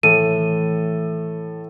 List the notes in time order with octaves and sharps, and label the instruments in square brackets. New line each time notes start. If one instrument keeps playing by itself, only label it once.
[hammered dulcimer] A2 [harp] E3 [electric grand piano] A4 [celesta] D#7